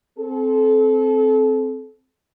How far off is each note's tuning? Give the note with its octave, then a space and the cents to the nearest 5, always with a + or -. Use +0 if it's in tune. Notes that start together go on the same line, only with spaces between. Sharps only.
C4 +0 A4 -30